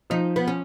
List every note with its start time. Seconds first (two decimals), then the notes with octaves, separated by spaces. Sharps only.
0.10 F3 D#4
0.36 B3
0.48 C#4